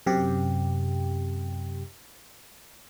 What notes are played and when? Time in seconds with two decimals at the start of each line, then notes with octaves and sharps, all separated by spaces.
0.06 F#2 C3 G4